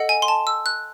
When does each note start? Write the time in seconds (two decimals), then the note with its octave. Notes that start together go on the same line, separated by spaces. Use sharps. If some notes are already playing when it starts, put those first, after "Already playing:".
Already playing: A4 D#5 F#5
0.09 G#5
0.22 C6
0.28 A5
0.47 E6
0.66 F#6